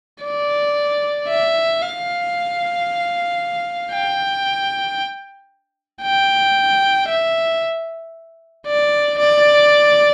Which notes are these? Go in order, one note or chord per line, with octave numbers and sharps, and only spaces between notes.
D5
E5
F5
G5
G5
E5
D5
D5